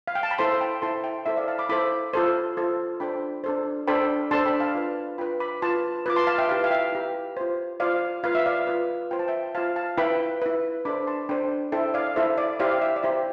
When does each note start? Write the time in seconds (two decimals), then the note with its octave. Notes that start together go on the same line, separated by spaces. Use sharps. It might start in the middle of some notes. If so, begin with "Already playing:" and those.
0.08 F5
0.15 G5
0.23 A5
0.31 B5
0.38 E4 A4 C5 A5 C6
0.51 C6
0.60 G5 B5
0.82 E4 A4 C5 A5 C6
1.04 E5 G5
1.26 E4 A4 C5 E5
1.37 D5 F5
1.48 F5 A5
1.59 B5 D6
1.69 E4 A4 C5 B5 D6
2.13 F4 A4 C5
2.57 F4 A4 C5
3.00 D4 A4 C5 G5 B5
3.44 D4 A4 C5
3.87 D4 A4 C5 G5 B5
4.31 D4 A4 C5 A5 C6
4.46 G5 B5
4.60 F5 A5
4.75 F4 B4
5.18 F4 B4 G5 B5
5.40 B5 D6
5.62 F4 B4 A5 C6
6.06 F4 B4 D6
6.16 A5 C6
6.27 F5 A5
6.38 E5 G5
6.49 E4 G4 B4 F5 A5
6.64 F5
6.71 E5 G5
6.92 E4 G4 B4
7.37 F4 C5
7.80 F4 C5 D5 F5
8.23 F4 B4 F5
8.35 E5
8.46 D5 F5
8.67 F4 B4
9.11 F4 C5 G5
9.19 A5
9.28 E5 G5
9.55 F4 C5 F5 A5
9.76 F5 A5
9.97 E4 B4 G5 B5
10.42 E4 B4
10.85 D4 A4 C5 B5 D6
11.07 A5 C6
11.29 D4 A4 C5 G5 B5
11.72 E4 A4 C5 E5 G5
11.94 D5 F5
12.16 E4 A4 C5 E5
12.38 D5
12.60 E4 G4 C5 D5 F5
12.82 E5
12.96 D5
13.03 E4 G4 C5 E5